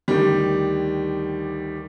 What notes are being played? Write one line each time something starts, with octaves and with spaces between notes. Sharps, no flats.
D2 D#3 G3